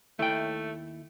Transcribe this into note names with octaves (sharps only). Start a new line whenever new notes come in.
D#2 A3 E4 G5